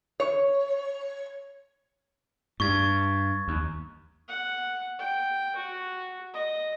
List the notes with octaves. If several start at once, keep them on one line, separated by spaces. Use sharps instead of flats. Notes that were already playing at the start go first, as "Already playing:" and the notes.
C#5
G2 C#6 G#6
D#2
F#5
G5
F#4
D#5